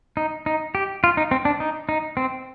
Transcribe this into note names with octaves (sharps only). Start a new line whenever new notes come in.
D#4
D#4
G4
F4
D#4
C4
D4
D#4
D#4
C4